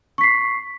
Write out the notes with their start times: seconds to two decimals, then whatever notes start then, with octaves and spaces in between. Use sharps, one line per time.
0.18 C#6
0.21 B6
0.24 C7